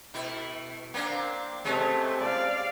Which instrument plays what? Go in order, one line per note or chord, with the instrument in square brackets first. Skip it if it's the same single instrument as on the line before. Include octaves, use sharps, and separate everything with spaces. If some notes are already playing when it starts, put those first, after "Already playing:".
[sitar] B2 A3 E4
A#3 C4 D4
[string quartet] C3 A3 [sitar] G#3 C#4
[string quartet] D5 F5